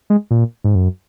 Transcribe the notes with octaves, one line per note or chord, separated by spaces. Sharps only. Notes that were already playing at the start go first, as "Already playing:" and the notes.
G#3
A#2
G#2
F#2